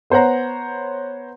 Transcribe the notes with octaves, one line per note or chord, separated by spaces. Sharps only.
B3 C5 C#5 F#5 A#5